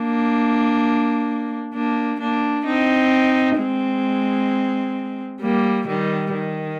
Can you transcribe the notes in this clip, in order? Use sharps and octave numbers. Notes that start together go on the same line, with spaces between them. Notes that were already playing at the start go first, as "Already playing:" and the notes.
Already playing: A#3 D4
A#3 D4
A#3 D4
C4 D#4
G#3 C4
G3 A#3
D#3 G3
D#3